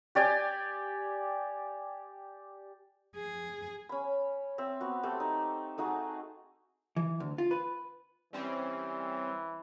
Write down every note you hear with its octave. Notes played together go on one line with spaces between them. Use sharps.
G4 D5 G5 G#5
G#4
C#4 B5
C4 E5
B3 F#4
A3 C4 G4 A4
D#4
A3 D#4 F#4 G#4
E3
D2
F4
B4
E3 G3 C4 C#4